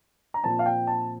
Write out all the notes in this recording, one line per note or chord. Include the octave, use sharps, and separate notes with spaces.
A#5
A#2 F3 C4 A5
F5
G5
A5